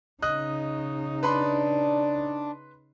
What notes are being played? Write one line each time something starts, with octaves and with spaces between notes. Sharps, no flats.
C#3 D#4 D#5 D#6 F#6
D4 B4 B5 C6